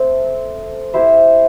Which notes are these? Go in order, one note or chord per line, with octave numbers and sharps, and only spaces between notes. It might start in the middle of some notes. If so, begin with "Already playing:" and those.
Already playing: A3 C4
E4 G4 C5 E5